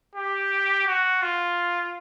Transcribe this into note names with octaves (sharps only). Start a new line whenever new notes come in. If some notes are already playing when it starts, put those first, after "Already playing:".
G4
F#4
F4